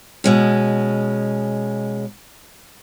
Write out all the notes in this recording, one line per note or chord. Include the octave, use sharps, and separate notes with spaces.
B2 G#3 C#4